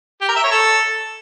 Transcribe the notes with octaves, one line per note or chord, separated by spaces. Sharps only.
G4
A#4
E5
C#5
A4